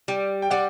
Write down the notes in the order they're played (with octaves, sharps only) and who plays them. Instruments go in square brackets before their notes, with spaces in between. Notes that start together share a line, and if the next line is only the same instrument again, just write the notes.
[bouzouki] G3
[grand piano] G5
[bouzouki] G3 [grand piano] D5 F#5